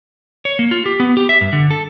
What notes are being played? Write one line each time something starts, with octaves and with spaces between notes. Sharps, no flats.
C#5
A#3
F4
G4
B3
G4
E5
G2
D3
A4